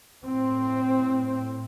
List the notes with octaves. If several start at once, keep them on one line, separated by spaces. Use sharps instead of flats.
A2 C4